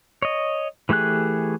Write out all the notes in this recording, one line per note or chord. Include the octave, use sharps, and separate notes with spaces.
C#5 D#5
E3 A3 G4 G#4 F#6